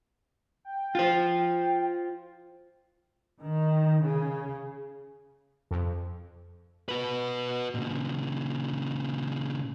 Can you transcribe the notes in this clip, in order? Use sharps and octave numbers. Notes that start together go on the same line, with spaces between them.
G5
F4 C5
D#3
C#3
F2
F#4 B4
A#2 C#3